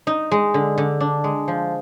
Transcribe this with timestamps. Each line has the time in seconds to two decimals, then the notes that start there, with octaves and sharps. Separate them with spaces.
0.07 D#4
0.31 G#3
0.54 D3
0.78 D3
1.00 D4
1.24 G#3
1.48 F3